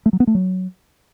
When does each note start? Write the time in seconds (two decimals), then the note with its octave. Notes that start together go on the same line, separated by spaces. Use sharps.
0.06 A3
0.13 F#3
0.20 B3
0.27 A3
0.35 F#3